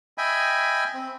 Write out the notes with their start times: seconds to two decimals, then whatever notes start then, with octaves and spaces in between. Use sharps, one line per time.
0.18 D#5 E5 G5 G#5 B5
0.94 C4